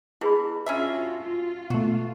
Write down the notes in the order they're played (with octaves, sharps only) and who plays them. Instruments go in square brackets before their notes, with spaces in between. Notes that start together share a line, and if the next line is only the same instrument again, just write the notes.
[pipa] B2 [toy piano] E4 G#4 B5
[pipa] C#4 D4 E5 [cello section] F4 F#4
[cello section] F4
[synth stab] B2 A3 [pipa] F#4